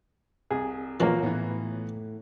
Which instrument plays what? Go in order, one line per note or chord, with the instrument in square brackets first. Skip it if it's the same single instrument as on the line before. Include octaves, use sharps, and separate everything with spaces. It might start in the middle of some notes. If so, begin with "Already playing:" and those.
[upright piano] C2 [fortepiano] G#4
[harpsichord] E2 A#2 F3 [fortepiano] A#3 C#4 F#4 [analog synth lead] F4
[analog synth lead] A2 [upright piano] E3 B3